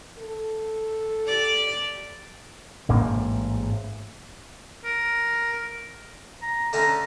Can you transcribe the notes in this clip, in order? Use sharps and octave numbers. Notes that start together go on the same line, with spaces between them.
A4
G4 D5
A1 G#2 A#3 C4
A#4
A#5
D3 A3 C#4 A#5